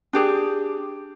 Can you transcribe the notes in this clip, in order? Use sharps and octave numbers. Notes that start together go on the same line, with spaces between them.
D4 G4 G#4